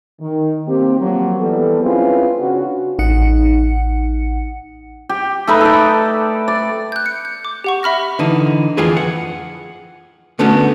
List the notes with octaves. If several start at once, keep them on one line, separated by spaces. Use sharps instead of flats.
D#3
A#3 C4 G4
F3 F#3 A#3
E3 G3 B3 A4
C4 C#4 E4 F4 G#4 B4
C#3 C#4 D4 F#4
A1 D#4 F#5 C#7
G4
A3 D#4 B4 B5
A4 D5
D5
F#6 G6
C#7
G6
D6
G4 F#5 C#6
E5 B5 F6 A#6
D3 E3 D#4
F2 E3 F4 G#4 B4
F#5
D3 A3 B3 C#4 D4 F#4